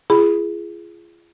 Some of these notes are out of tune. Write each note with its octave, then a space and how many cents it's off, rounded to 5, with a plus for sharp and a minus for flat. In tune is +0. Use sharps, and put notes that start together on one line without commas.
F4 -40 G#4 +0 B5 +0